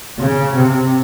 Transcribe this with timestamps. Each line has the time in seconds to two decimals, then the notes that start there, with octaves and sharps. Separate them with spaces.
0.18 C#3
0.55 C3